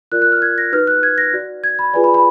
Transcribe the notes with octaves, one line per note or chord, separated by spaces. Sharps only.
F4 A#4 D5 F#6
F#6
F6
G#6
A#6
D#4 F#4 B4 F6
F#6
G#6
A#6
F#4 D5
G#6
B5
F4 G#4 B4 D5 G#5
B5
B5